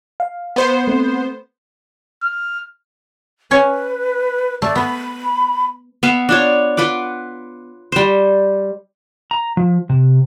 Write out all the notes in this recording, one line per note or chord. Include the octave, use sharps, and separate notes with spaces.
F5
B3 C5
A3 C4
F6
C#4 B4 C#5 G#5
A3 D5
B3 B5
B3 E5 F5
D4 F4 C#5
F4 B4 F#5 D6
G3 C5
A#5
F3
C3